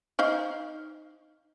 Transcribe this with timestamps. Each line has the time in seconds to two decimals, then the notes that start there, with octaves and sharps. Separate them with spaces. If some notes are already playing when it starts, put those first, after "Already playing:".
0.19 D#4 C5 F5